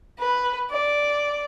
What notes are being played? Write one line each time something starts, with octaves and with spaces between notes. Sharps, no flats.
B4
D5